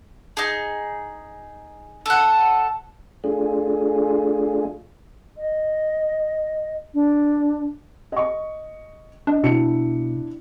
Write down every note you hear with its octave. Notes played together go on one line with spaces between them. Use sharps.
D#4 G#4
A4 F#5
A3 D4 F4 G#4
D#5
D4
D#5 C#6
D4 D#5
B2 D4 E4 C#7